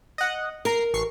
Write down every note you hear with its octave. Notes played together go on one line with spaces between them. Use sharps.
D#5 F#5
A#4 A#5 C7
A1 C#6 C7